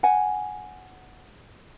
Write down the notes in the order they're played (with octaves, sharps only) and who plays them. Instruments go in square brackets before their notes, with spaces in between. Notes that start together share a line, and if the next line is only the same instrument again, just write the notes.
[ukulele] F#5 G#5